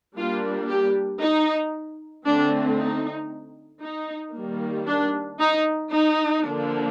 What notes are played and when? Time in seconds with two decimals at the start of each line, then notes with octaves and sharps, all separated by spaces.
0.16 G3 A#3 D4 F4
0.68 G4
1.20 D#4
2.25 D3 A3 C4 D4
2.77 D#4
3.81 D#4
4.34 D#3 G3 A#3
4.87 D4
5.39 D#4
5.91 D#4
6.44 D3 F3 A#3 D4